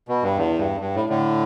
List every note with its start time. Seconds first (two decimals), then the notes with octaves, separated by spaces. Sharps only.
0.08 B2
0.23 G2
0.37 E2
0.58 G2
0.80 G2
0.95 A2
1.09 A2 D3